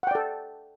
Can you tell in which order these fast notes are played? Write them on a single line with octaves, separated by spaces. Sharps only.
F#5 G5 D5 A4